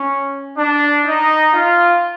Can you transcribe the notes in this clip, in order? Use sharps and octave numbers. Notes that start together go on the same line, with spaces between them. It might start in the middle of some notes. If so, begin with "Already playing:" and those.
Already playing: C#4
D4
D#4
F4